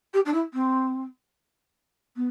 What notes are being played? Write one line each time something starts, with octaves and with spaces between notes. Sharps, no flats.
G4
D4
E4
C4
B3